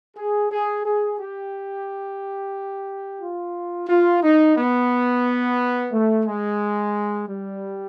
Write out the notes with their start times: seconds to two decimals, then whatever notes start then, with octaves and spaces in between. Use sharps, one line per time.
0.17 G#4
0.51 G#4
0.84 G#4
1.18 G4
3.21 F4
3.89 F4
4.23 D#4
4.56 B3
5.92 A3
6.25 G#3
7.27 G3